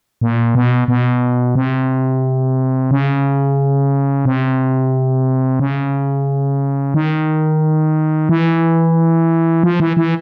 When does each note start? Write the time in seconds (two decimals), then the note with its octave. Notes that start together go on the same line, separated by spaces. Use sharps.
0.21 A#2
0.55 B2
0.88 B2
1.55 C3
2.91 C#3
4.25 C3
5.60 C#3
6.94 D#3
8.29 E3
9.63 F3
9.80 E3
9.97 E3